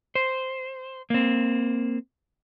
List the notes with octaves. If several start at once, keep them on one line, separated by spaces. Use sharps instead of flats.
C5
A#3 C4